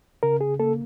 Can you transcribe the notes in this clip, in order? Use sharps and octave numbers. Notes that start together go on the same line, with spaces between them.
C#3 A#4
G#4
A#3 A4